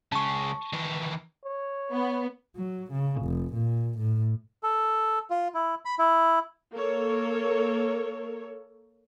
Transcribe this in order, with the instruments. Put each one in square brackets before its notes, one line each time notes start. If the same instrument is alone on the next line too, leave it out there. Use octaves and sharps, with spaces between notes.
[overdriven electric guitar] C#3 G#3 [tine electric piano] A5 C#6
[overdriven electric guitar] D#3 E3
[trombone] C#5
[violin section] B3
[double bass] F#3
C#3
F1
A#2
A2
[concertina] A4
F4
E4
B5
E4
[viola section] A#3 A4 A#4 C#5